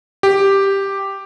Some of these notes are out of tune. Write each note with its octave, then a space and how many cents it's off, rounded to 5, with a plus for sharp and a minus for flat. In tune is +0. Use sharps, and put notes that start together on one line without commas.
G4 +0